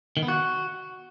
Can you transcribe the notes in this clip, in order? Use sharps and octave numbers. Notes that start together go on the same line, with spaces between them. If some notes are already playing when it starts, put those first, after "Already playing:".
D#3
B3
F#4